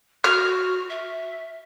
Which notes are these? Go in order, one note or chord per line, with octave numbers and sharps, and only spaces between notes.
F#4 F6
E5